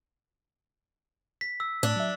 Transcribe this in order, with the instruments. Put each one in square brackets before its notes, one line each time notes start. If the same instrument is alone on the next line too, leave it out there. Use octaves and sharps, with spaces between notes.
[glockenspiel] B6
E6
[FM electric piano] A2 [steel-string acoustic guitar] D4
[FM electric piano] F#3 E5